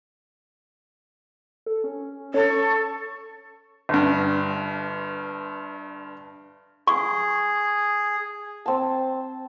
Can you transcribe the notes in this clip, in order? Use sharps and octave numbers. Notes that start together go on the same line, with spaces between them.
A4
C#4
A4 C#5
C#6
G1 G2
G#4 C#6
C4 A5